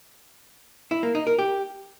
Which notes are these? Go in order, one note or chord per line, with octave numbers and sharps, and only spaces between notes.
E4
A#3
D#4
A#4
G4